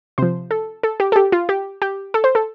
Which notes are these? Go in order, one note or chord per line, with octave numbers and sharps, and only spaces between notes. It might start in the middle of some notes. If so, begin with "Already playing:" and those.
C3 F3 C5
A4
A4
G4
A4
G4
F4
G4
G4
A4
C5
A4